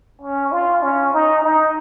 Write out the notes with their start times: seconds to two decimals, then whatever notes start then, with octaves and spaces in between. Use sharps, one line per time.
0.21 C#4
0.52 F4
0.82 C#4
1.14 D#4
1.44 D#4